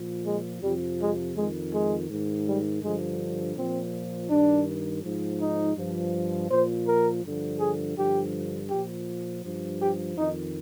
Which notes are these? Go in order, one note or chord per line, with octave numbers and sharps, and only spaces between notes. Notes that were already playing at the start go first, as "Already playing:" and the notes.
Already playing: A#2 F3
G#3
F2 C3 F3 G3
G#3
F2 D#3 G#3
G#3
G#2 D#3
G3
G2 D3 F3 G#3
A#2 F3 C4
G2 D#3 D4
G#2 F3
D#4
G2 F3
A#2 F3 C5
A#4
G2 D3 F3
G#4
G2 D3 F3 G4
A#2 F3 G4
G2 F3
G4
F2 D#3 D#4